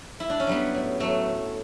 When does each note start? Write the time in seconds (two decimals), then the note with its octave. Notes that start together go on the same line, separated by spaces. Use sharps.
0.20 E4
0.30 D4
0.40 C#4
0.47 F#3 G3 B3
0.75 A2
1.00 A2 F#3 A3